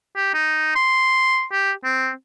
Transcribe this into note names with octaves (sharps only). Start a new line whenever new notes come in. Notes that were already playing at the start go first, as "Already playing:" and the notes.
G4
D#4
C6
G4
C4